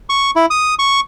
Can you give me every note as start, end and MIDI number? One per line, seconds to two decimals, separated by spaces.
0.09 0.31 85
0.36 0.46 64
0.50 0.74 87
0.79 1.00 85